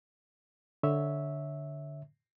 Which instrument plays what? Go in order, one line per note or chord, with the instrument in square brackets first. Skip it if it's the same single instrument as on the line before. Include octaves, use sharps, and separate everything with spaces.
[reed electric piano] D3 C#5 E5